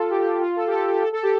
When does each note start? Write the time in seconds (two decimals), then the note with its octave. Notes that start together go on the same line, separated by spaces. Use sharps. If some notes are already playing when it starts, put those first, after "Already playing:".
Already playing: F4 A4
0.10 G4
0.21 G4
0.41 F4
0.56 A4
0.67 G4
0.72 A4
0.87 G4
1.02 A4
1.13 A4
1.23 G4